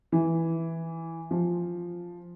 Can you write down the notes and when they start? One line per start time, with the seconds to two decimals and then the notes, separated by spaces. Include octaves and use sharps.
0.12 E3
1.31 F3